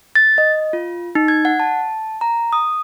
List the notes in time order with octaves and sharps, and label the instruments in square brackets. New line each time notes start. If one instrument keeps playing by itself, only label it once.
[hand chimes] A6
D#5
F4
D#4
G#6
F#5
A5
A#5
D#6